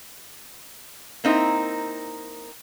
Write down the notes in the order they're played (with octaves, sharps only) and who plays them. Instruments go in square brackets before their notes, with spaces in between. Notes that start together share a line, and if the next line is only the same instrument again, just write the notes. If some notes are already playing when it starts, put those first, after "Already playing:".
[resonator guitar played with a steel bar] A#3 C4 D#4 E4 A#4